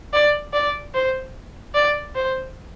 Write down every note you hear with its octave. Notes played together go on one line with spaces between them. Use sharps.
D5
D5
C5
D5
C5